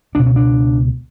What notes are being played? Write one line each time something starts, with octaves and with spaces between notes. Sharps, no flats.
C#2 B2 D4
C#4
D4